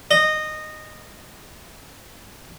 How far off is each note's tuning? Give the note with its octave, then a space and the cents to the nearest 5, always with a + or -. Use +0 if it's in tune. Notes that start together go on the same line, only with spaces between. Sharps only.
D#5 -15